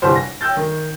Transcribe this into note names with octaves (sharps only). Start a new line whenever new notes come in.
G1 C2 E3 G3 C5
A#6
G5 E6 G6 A6
D#3